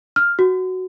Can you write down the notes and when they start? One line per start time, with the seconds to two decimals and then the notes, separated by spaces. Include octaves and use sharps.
0.16 F6
0.39 F#4